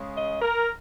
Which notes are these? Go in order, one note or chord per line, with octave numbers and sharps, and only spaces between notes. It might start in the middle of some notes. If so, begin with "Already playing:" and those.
Already playing: C#3 G#3
D#5
A#4